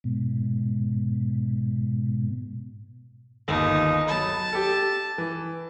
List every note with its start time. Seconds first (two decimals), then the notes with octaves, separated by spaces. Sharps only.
0.04 G#2 B2
3.48 G1 D#2 D#4
4.08 F#3 A5 B5
4.53 G4 A4
5.18 E3